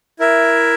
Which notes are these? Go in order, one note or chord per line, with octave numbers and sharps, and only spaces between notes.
E4 A#4 E5